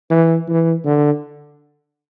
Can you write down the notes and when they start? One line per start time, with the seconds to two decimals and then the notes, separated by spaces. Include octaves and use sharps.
0.10 E3
0.48 E3
0.85 D3